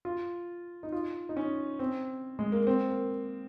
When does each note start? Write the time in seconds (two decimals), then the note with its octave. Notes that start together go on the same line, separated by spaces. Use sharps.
0.05 F4
0.83 D#4
0.92 F4
1.29 D#4
1.37 C#4
1.79 C4
2.39 G#3
2.52 A#3
2.67 C4
2.89 A#3